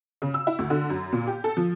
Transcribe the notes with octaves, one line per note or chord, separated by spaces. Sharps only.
C#3
E6
E4
D2
D3
F#2
A#2
G4
A4
F3